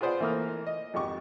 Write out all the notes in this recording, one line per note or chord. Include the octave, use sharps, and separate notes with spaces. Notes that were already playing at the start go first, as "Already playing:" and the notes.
F4 G#4 B4 C5 D5 F#5
E3 A3 A#3 D#6 F6
D#5
G#1 F2 G4 C#6 D6